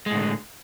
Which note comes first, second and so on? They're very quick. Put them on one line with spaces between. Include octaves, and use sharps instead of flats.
G#3 A2 D3